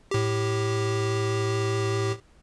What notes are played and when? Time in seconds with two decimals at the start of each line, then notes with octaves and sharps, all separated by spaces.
0.11 A2 G4